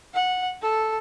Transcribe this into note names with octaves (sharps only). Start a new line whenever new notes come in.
F#5
A4